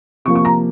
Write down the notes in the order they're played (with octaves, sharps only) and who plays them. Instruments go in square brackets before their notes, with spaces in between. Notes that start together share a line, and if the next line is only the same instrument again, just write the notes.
[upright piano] C3 F3 A#3 C#6
C#6
A#5